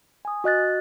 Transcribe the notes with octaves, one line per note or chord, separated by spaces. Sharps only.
G#5 D#6
F#4 D#5 F#6 A6